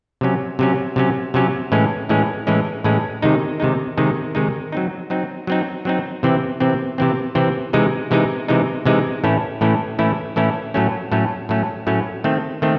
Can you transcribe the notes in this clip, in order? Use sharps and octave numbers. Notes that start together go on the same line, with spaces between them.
C3 F#3 C#4
C3 F#3 C#4
C3 F#3 C#4
C3 F#3 C#4
A2 E3 G#3 C#4
A2 E3 G#3 C#4
A2 E3 G#3 C#4
A2 E3 G#3 C#4
C3 D#3 G#3 D#4
C3 D#3 G#3 D#4
C3 D#3 G#3 D#4
C3 D#3 G#3 D#4
F#3 C4 D#4
F#3 C4 D#4
F#3 C4 D#4
F#3 C4 D#4
C3 E3 C4
C3 E3 C4
C3 E3 C4
C3 E3 C4
C3 E3 G#3 D#4
C3 E3 G#3 D#4
C3 E3 G#3 D#4
C3 E3 G#3 D#4
A2 E3 A3 C#4 E4
A2 E3 A3 C#4 E4
A2 E3 A3 C#4 E4
A2 E3 A3 C#4 E4
A2 F#3 A3 C#4
A2 F#3 A3 C#4
A2 F#3 A3 C#4
A2 F#3 A3 C#4
D#3 A3 C4
D#3 A3 C4